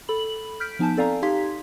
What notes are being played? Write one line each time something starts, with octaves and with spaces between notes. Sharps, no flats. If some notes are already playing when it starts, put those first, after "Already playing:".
A4 B5 F#7
F6 G6 B6 D7
F3 B3 D#4 G#5 A5 G6
C4 A4 D5 F5 G#5 A#5
D#4 G4 F5 C6 G#6 B6